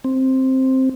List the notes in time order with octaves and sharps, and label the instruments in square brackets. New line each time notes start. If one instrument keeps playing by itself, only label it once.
[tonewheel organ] C4